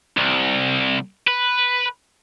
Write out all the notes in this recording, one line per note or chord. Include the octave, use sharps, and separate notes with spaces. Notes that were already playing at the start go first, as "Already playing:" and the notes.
C2
B4